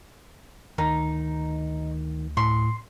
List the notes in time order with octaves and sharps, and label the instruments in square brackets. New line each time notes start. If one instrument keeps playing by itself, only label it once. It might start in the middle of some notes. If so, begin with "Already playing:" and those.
[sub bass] D2 [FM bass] D#3 [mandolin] D#4
[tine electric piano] A2 [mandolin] C6